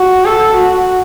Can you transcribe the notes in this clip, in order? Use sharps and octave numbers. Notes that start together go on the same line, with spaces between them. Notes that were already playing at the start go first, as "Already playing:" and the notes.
Already playing: F#4
A4
F#4